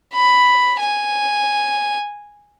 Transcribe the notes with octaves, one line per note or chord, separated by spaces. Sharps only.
B5
G#5